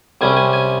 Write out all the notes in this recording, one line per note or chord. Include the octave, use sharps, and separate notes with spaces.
C2 C3 G3 C#4 G#5
G#5
G#5